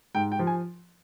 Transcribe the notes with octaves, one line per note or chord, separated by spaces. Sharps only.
G#2 G5
G5
F3
G#5